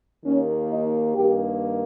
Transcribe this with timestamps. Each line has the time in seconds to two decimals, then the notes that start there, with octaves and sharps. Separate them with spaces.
0.25 D#2 D#3 A#3 C#4
0.70 D#4
1.15 G2 D#3 A#3 G4